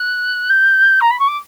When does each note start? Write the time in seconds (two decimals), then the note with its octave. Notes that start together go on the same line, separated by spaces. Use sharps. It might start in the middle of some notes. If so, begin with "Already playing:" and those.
Already playing: F#6
0.50 G6
1.01 A#5
1.11 B5
1.19 C#6
1.28 D6